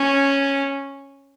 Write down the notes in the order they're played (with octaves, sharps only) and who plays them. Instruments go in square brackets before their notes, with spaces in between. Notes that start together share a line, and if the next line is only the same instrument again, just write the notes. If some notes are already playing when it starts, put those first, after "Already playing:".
Already playing: [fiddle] C#4